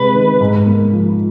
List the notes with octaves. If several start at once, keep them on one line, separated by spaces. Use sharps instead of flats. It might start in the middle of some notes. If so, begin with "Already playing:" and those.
Already playing: C3 G#3 B4
D#3
G#2
A#3
F3